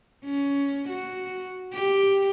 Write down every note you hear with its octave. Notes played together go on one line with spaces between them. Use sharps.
C#4
F#4
G4